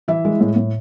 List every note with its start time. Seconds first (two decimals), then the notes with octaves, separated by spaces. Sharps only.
0.08 E3 E4 E5
0.25 G#3
0.40 A2
0.56 A2